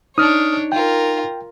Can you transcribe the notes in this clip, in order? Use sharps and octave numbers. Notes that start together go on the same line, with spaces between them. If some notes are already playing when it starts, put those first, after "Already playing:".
D4 D#4 C#5 D#6 F6
F4 A#4 G5